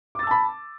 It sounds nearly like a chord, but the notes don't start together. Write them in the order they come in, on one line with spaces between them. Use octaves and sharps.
D6 A6 E6 A5 B5